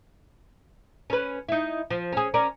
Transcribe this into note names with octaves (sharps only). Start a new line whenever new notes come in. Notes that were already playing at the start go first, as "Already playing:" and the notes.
C#4 B4
D#4 E4
F3
C#4 G#4
C#4 A#4 D5